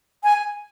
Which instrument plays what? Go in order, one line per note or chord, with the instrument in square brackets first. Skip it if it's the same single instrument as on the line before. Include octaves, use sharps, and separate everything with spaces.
[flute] G#5